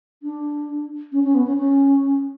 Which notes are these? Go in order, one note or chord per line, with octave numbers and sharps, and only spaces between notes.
D4
C#4
C#4
B3
C#4
C#4